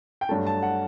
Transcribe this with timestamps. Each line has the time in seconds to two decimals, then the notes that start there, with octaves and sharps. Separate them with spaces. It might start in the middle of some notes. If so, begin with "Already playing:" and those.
0.21 G5
0.29 G2 F#3 A3 A5
0.46 A5
0.63 F#5